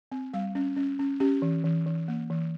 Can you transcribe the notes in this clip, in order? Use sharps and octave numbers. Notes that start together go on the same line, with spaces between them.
C4
G3 F5
C#4
C#4
C#4
C#4 G4
E3
E3
E3
A#3
E3